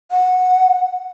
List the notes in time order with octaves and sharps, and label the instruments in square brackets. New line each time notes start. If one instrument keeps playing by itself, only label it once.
[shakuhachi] F#5